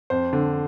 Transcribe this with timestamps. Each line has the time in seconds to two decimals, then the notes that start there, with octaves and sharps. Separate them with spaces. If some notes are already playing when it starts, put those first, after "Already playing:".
0.10 F2 C5
0.33 D3